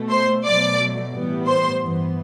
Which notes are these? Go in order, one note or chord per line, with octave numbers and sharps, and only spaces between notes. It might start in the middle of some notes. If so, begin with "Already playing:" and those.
Already playing: B2 A3
C5 C6
B2 F#3 A3 D5 D6
A2 E3 G3 B3
C5 C6
G2 E3 B3